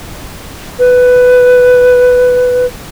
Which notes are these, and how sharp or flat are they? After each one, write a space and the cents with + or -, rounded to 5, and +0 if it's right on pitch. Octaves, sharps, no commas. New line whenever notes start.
B4 +10